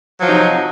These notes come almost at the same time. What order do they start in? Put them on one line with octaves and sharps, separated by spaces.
F#3 F3 D#4 C3